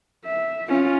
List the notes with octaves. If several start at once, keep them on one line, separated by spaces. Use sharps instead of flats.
E5
C#4 F4